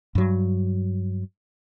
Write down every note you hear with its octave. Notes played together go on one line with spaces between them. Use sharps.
G2 F#3